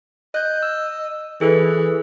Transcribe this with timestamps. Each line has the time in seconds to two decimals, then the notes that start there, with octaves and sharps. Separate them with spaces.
0.35 D#5 F#6 G6
0.63 E6
1.41 E3 G#4 A4 B4